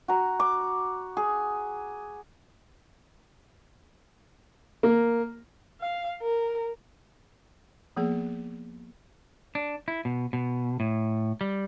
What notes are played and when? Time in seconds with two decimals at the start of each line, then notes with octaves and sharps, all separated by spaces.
0.08 F#4 A#5
0.40 D6
1.17 G#4
4.83 A#3
5.81 F5
6.22 A#4
7.97 F3 A#3 B3 G#4
9.55 D4
9.88 E4
10.05 B2
10.33 B2
10.80 A2
11.41 G3